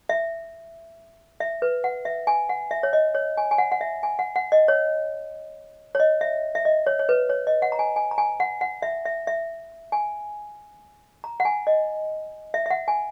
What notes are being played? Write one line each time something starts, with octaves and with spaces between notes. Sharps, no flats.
E5
E5
B4
F#5
E5
G#5
F#5
E5
C#5
D#5
C#5
G#5
G#5
F#5
F#5
E5
G#5
F#5
F#5
D#5
C#5
C#5
D#5
E5
E5
D#5
C#5
C#5
B4
C#5
D#5
F#5
A#5
G#5
G#5
A#5
G#5
F#5
F#5
E5
E5
E5
G#5
A#5
F#5
G#5
D#5
E5
E5
F#5
G#5